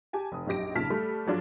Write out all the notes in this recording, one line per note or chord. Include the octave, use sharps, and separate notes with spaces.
G4 G#5 A5
F1 D#6
A#1 F#2 D#4 G4 A#6 D7
B1 A#2 C#3 A5 F6 B6
G3 A3 A4
F3 F#3 D4 F4 A4